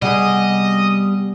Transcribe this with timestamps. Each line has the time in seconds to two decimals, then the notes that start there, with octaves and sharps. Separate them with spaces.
0.02 C3 G3 B3 G#4 D#5 F#5